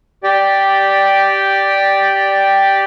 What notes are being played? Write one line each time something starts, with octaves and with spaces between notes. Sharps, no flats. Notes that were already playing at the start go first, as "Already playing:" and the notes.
G4 D5 G5